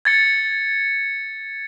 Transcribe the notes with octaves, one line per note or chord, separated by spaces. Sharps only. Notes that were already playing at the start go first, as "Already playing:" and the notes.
G#6 A6 C#7